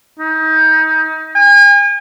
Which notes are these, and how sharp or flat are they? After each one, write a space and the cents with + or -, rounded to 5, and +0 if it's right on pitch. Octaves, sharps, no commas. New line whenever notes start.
D#4 +30
G#5 -40